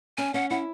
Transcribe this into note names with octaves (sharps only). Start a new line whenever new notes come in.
C#4 G#5
C#4 F#5
E4 F#5